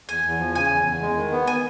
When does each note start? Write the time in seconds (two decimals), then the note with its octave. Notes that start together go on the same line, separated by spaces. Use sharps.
0.09 E2 G#5
0.25 E2
0.39 F3
0.55 C#3 G#5
0.71 E2
0.87 E2
1.02 G#3
1.17 D#3
1.32 B3
1.47 G#5